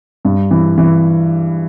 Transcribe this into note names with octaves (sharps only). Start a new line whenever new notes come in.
G2
E3
E3